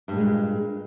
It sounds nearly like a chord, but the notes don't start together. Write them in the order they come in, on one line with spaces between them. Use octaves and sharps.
G2 A#2 G#3